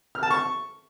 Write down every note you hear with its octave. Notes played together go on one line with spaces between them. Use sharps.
F6
A5
C#6